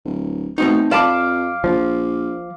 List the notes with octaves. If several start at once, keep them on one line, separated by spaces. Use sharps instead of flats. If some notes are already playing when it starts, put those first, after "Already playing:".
D1
B2 A3 C4 D#4
F2 D5 F5 A5 B5 D6
A#1 F3